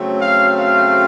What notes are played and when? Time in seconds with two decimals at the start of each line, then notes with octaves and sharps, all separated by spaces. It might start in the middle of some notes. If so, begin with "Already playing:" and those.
Already playing: C#3 F#3 A3 C4
0.20 F5
0.58 F5